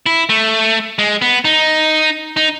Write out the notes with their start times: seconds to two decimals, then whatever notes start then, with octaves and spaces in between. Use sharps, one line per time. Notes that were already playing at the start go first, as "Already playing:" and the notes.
0.06 E4
0.29 A3
0.99 G#3
1.22 B3
1.45 D#4
2.37 D#4